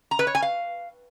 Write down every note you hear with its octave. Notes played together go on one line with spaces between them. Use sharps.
A#5
B4
C#5
G#5
F5